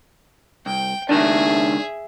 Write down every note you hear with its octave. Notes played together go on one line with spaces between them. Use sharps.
C2 G5
C#2 D#3 D4 G#4 E5